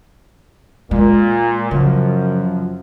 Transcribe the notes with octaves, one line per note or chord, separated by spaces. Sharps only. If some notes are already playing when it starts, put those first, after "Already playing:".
A#2 G#3
F#2 C#3 F3